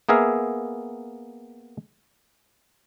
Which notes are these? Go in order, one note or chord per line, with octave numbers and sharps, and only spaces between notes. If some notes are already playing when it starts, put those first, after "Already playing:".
A#3 B3 G#4 A#4 E5 F5